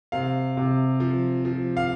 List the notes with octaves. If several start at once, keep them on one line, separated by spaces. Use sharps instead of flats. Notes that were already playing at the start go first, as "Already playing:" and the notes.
C3 F5
C3
F3
F3
F5